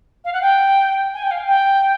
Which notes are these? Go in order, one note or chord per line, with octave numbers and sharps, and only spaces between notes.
F5
F#5
G5
G#5
G5
F5
G5